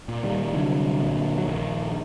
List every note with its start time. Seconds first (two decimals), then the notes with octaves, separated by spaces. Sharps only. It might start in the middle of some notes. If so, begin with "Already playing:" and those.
0.08 A#2
0.23 D#3 G3
0.44 G3
0.54 C2 D3 F#3
1.01 A#2
1.38 F#3
1.46 A#1 D#3